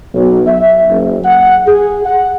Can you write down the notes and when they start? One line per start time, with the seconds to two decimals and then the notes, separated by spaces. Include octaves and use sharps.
0.14 B1
0.47 E5
0.88 F#1
1.25 F#5
1.67 G#4
2.06 F#5